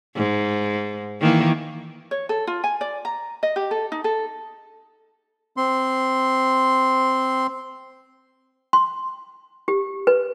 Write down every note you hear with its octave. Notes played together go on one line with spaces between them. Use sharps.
G#2
D#3 E3 A#3
C#5
A4
F4
G#5
D5
A#5
D#5
G4
A4
D#4
A4
C4 C6
C6
G4
B4